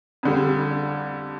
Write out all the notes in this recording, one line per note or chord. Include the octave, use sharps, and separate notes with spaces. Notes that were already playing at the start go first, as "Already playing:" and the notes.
F2 D3 G3